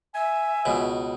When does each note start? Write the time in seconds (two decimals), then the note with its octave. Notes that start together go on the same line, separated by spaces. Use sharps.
0.15 E5 G#5
0.65 C#2 B2